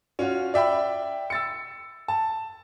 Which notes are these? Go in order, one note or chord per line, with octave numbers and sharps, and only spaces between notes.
C#4 F4 F#4
D5 E5 G5 B5
E6 A6 C#7
A5